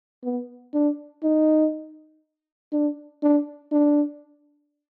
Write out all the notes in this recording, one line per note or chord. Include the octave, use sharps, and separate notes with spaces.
B3
D4
D#4
D4
D4
D4